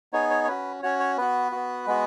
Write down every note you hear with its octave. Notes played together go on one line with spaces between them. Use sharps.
B3 D#4 G#4 C#5
C#5
C#5
C#4 F#4 B4
C#4 F#4 C#5
C#5
B3 F#4 B4
B3 F#4
G#3 B3 F#4